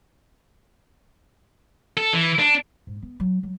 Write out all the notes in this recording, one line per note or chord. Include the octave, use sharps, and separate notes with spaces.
A4
E3
D4
G#2
B3
F#3
F#3